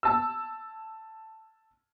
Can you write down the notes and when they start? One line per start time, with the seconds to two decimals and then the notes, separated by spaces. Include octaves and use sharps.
0.03 A5 E6